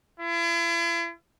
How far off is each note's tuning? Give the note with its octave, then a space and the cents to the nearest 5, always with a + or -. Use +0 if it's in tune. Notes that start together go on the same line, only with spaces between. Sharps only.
E4 +45